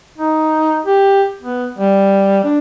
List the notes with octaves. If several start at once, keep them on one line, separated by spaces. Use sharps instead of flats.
D#4
G4
B3
G3
D4